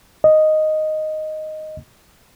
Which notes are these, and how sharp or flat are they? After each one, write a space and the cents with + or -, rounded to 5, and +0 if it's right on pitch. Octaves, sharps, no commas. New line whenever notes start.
D#5 -5